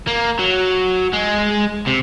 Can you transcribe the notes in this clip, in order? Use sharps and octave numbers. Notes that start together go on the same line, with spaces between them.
A#3
F#3
G#3
C3